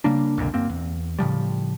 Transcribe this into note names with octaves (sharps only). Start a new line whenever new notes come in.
C#3 G3 A#3 D4
C2 F2 A#2 D3
F#2 A#3 C4
E2
A2 C#3 F3 G3